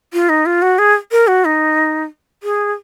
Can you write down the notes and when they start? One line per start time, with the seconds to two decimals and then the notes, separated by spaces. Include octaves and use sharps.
0.13 F4
0.29 D#4
0.46 F4
0.62 F#4
0.79 G#4
1.12 A#4
1.27 F#4
1.45 D#4
2.43 G#4